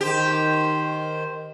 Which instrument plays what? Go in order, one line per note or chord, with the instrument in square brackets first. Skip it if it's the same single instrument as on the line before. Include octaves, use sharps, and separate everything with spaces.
[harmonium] D#3 C5 [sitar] G4